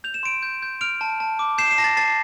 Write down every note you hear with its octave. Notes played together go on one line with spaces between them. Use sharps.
G6 F7
E7
C6 D7 F7
G6
G6
F6 D7 F7
A5
A5
D6
G6 C7 E7
C7 E7
A5 A#6
A6
A5 A6 C7